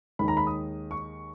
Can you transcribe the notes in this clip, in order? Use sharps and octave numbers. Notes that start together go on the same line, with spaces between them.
D#2 D#3 G#3 B5
A#5
B5
D#6
C#6